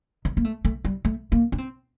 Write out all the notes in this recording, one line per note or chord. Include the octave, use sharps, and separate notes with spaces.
D#3
A#3
A3
A3
G3
A3
A#3
D4
C4